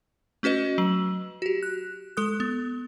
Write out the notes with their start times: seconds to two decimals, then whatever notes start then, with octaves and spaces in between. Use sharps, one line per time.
0.43 A3 C#4 F#4 B4 D#5
0.78 F#3 F#7
1.42 F#4 G4
1.63 F#6
2.17 G#3 A4 D#6 F#6
2.40 B3